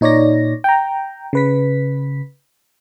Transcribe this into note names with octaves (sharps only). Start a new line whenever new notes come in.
A#2 D#4 C#5 D5 A#6
G5 A#5
C#3 B4 B6